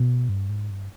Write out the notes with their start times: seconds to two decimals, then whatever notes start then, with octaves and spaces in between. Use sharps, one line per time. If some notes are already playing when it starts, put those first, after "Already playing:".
Already playing: B2
0.29 G2
0.49 G#2
0.71 G2